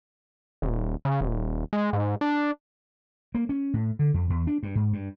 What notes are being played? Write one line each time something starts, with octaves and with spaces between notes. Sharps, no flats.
D#1
C#3
D#1
G#3
G#2
D4
A#3
C#4
A2
D3
F2
E2
D4
G2
G#2
G2